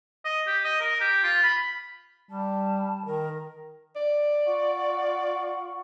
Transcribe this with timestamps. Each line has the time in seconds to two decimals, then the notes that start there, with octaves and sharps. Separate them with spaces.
0.25 D#5
0.47 G4
0.65 D#5
0.80 A#4
1.00 G4
1.23 F4
1.43 B5
2.29 G3 A5
3.06 D#3 A#4
3.96 D5
4.46 F4 F#5 C#6